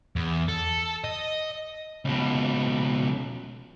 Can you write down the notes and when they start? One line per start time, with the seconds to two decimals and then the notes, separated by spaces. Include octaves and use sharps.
0.16 E2
0.49 A4
1.04 D#5
2.05 C#2 B2